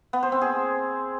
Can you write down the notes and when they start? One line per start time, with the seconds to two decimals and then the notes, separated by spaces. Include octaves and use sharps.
0.13 B3
0.23 C5
0.32 C4
0.41 G#4